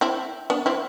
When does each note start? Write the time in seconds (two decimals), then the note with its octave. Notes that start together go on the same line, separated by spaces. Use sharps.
0.01 C4 E4
0.50 B3 D4
0.66 C4 E4